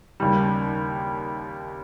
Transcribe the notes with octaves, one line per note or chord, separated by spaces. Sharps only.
D#2 C#3 G3